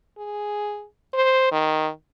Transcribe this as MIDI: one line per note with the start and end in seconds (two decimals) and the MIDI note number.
0.18 0.85 68
1.14 1.47 72
1.52 1.89 51